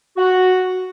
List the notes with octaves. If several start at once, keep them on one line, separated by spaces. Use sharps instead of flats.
F#4